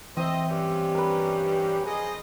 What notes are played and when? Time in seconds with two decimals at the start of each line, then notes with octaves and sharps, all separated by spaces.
0.17 E3 C4 C5 D#5 E5
0.50 G2 C#4 G4
0.95 A#4 B4
1.86 F3 G#4 D#5